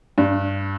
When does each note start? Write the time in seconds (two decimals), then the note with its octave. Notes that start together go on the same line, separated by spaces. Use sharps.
0.18 G2